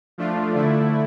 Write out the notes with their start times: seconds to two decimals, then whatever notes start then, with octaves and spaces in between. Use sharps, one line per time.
0.18 F3 A3 D4 F4
0.55 D3 A3 E4